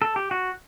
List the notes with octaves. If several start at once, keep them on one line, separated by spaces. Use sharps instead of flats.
A4
G4
F#4